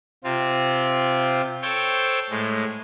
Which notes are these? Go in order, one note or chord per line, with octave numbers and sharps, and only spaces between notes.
C3 C4 F4
A4 C5 C#5 G5 C6
A2 G#3